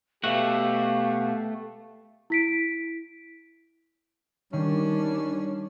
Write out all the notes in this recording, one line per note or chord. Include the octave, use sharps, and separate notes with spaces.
B2 A3 F#4 G4 F5
E4 B6 D7
D#3 G3 C#4 D4